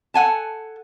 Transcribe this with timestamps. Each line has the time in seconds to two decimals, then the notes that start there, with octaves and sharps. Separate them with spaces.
0.14 A4 F#5 G#5 A5